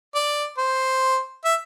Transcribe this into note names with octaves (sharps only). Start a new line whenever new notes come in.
D5
C5
E5